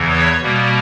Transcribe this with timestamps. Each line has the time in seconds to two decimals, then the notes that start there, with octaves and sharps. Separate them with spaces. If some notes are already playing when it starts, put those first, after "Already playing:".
Already playing: E2 C#3 E3
0.09 C#5
0.42 B2 G3 A#3